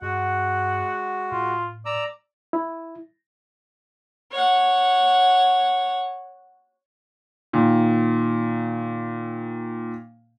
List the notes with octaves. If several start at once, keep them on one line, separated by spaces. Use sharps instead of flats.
G2 G#3 F#4 F#5
A2 F4
D5 A#5 E6
E4
C#5 F#5
A#2 D#3